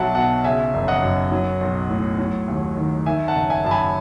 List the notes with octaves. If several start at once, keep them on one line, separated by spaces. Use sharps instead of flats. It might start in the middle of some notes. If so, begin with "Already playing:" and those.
Already playing: B1 F#3 E5 F#5 A5
B2 F#5 A5
C#3 E5 G#5
F#1
D#5 F#5
F#2
F#3
B1
A2
F#3
D#2
D#3
D#3 E5 G#5
F#5 A5
F#1
E5 G#5
F#2 A5
G#5 B5